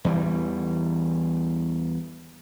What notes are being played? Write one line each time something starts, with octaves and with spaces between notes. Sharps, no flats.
E2 E3 G3